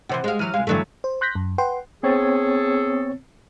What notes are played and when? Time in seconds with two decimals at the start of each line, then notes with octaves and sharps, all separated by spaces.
0.09 C3 D#3 E3 C5 F#5
0.24 G#3 F5
0.39 E3 F#3 F6 D#7
0.54 C2 G#3 F5
0.67 G2 D3 E3 F#3 G3 A3
1.04 C5
1.21 C6 F#6 G6 A#6 B6
1.35 F#2
1.58 B4 F#5 G5 C6
2.03 B3 C4 G#4 A4 C#5